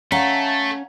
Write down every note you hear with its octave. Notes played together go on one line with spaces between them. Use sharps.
A3 C#4 F5 F#5 A#5